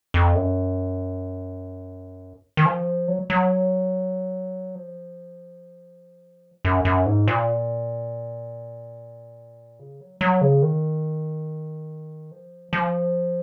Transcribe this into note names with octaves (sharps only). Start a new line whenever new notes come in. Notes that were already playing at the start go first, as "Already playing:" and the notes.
F2
F#2
D#3
F3
F#3
F#3
F3
F#2
F#2
G#2
A#2
C#3
F#3
F#3
C#3
D#3
F3
F3